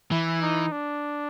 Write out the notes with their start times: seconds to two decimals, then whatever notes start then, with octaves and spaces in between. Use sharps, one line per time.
0.12 E3 E4
0.42 D#4
0.72 D4